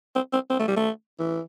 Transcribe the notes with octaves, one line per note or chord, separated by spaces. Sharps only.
C4
C4
C4
A3
G3
A3
E3